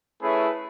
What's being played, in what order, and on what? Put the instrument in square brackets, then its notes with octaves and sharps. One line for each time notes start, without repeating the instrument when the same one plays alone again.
[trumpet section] A3 C#4 E4 G#4 B4